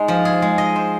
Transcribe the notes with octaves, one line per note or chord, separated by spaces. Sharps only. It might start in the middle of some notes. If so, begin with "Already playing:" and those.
Already playing: G#3 D#4
F3
G#4
G#3
D#5
C5